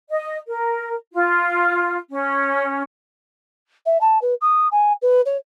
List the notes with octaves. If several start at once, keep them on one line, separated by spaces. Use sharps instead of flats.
D#5
A#4
F4
C#4
E5
A5
B4
D#6
G#5
B4
C#5